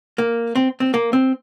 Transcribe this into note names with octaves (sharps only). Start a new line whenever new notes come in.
A#3
C4
C4
A#3
C4